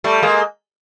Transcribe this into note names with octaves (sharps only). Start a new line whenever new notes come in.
G3 A3
G#3 A#3